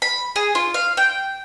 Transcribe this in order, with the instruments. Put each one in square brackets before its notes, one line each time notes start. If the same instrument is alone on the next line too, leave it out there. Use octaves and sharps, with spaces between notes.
[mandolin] B5
G#4
F4
F5
G5